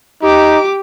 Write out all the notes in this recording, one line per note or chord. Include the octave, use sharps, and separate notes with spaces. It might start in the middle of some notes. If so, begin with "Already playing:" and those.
D#4 G4 D6